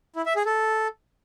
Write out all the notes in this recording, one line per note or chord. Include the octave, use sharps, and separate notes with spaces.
E4
E5
G#4
A4